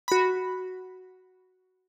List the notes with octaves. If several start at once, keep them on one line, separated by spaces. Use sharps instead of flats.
F#4 B5